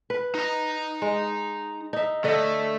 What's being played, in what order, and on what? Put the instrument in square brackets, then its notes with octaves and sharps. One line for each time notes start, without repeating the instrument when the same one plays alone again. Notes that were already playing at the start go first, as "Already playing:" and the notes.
[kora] B4
[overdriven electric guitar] D#4 A#5
[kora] G#3
D#4 E5
[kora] D3 D#5 [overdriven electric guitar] A3